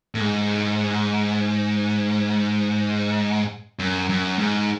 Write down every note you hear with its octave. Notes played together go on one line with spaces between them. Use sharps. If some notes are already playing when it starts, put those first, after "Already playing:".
A2
G#2
F#2
F#2
G#2